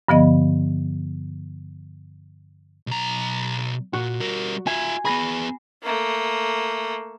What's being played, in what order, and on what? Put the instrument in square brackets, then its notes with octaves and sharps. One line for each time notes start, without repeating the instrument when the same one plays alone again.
[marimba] G2 D3 F3 B3 D#5
[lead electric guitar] B1 A#5
[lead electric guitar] A#2 [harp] F#4
[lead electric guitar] G3 A#4
[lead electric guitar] F4 E5 [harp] G#5
[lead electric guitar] B3 G#4 [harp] B5 A#6
[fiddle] A3 A#3